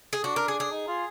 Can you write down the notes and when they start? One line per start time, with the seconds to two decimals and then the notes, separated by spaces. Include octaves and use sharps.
0.13 G#4
0.24 D4 F#4
0.36 A#4
0.48 G#4
0.60 G#4
0.72 D#4
0.88 F4